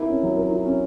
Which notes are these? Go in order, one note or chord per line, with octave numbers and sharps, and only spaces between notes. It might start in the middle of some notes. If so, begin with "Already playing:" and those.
Already playing: E4 A#4
C#4
F#3
A#4
E4
C#4